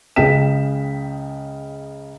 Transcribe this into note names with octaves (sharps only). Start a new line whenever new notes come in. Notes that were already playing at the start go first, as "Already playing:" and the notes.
C#2 C#3 G#4 G5 B6 E7